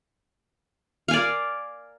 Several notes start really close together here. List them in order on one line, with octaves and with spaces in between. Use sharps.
F5 G#5 D5 A#4